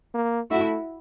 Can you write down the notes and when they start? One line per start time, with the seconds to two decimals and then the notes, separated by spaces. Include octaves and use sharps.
0.14 A#3
0.51 A3 E4 F#4